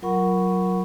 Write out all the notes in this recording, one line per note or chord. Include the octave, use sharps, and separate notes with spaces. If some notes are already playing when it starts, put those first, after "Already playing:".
F#3 F4 A#4 F#5 B5 C#6